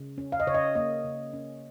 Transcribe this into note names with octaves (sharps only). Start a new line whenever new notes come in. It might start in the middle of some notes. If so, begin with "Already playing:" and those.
Already playing: C#3
C#4
F5
D#5
C#3 C#5
D#5
A#3 D#5
C#3
C#4